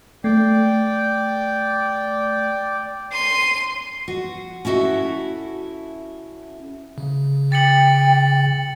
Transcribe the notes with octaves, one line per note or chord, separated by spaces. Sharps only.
A3 D5 G5
C6 D#7
F#4
C#4 E4 F#4 A4 E5
C#3
G5 A6 C#7 F#7